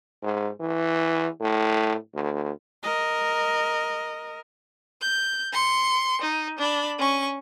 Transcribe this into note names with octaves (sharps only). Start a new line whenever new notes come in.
G#2
E3
A2
D2
A#4 D#5
G6
C6 C#7
D#4
D4 B5
C#4 C#6